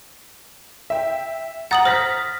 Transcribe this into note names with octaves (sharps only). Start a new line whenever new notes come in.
E5 G5
F#5 A#5 D#6 A6 F#7
C5 F6 A#6 B6